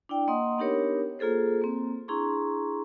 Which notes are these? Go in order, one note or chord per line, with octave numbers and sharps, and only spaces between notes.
D4 E4 D5 G5
A#3 D#5 F#5 C6 D#6
B3 D4 D#4 G4 A#4 C#5
A#3 F4 G#4 A4 C5
A#3 C4
D4 E4 G#4 A#5 C6 C#6